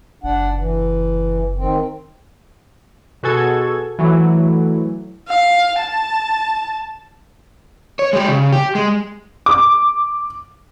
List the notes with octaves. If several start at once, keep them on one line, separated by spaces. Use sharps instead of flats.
F#1 D4 F#5
E3
D#3 C4
B2 F#4 G#4 A4 G#6
E3 F#3 A3
F5
A5
C#5
G#3 G4
C#3
G4
G#3
D6